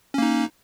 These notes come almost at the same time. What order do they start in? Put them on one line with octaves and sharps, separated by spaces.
C#4 A#3 D#4